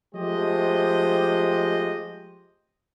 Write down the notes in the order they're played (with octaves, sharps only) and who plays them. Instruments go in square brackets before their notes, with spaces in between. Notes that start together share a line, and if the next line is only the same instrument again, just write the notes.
[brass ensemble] F3 G#3 A3 G4 C5 D#5